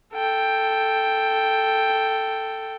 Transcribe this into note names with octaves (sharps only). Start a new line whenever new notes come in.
A4 G5